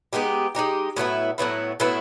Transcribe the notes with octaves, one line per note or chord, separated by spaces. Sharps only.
G#3 B3 D#4 G4
G#3 B3 D#4 G4
A2 F#3 B3 E4
A2 F#3 B3 E4
A2 F#3 B3 E4